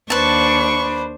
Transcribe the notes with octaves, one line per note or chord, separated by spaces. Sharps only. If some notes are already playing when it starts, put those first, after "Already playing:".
D#2 D4 B4 C5 A5 C#6